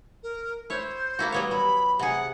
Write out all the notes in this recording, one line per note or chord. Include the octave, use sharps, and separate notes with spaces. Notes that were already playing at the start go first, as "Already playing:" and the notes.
A#4
E4 C5 C#5
A#3 E4 F#4
G3 B3 C#5
F#3 B5
C3 G#4 F#5